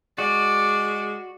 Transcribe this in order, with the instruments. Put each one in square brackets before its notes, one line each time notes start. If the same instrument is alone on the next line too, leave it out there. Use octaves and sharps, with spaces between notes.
[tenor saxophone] G#3 [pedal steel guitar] F#4 [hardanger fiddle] D5